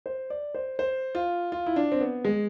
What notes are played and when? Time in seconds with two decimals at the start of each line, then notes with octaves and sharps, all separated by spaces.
0.06 C5
0.30 D5
0.55 C5
0.79 C5
1.15 F4
1.52 F4
1.67 E4
1.76 D4
1.92 C4
2.01 B3
2.25 G#3